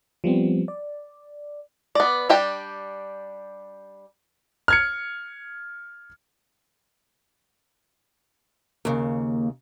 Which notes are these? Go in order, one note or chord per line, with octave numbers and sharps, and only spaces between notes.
F3 G3 B3 C4
D5
B3 D5
G3 D4 G4 G5
F6 G#6 C#7
D#2 C#3 A#3